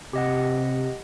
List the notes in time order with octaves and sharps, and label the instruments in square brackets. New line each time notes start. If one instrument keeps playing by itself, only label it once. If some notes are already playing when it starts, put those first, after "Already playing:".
[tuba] C3 [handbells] G4 D#5 F#5